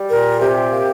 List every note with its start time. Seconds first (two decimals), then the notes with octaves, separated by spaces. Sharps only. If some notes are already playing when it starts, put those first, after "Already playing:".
Already playing: G3
0.10 A#2 A#4
0.41 C3 G4
0.71 A#3